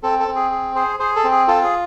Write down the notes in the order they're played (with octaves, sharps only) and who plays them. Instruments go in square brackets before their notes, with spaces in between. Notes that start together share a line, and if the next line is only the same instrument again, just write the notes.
[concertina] C4 A4
A4
C4
G#4
G#4
G#4 C5
G#4 C5
A4
C4
G#4
F4 A4
G#4